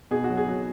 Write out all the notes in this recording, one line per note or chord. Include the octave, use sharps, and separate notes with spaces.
B2 G#4
F#4
F#3
G#4
F#3